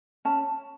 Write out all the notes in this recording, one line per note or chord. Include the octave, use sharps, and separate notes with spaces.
C#4 A5